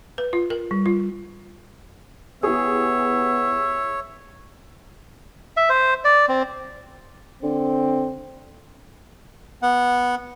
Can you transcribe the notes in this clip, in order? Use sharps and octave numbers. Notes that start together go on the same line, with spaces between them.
B4
F4
A#4
G3
F4
B3 E4 G4 G#4 C#5 E5
E5
C5
D5
C4
D3 C4
B3 F#5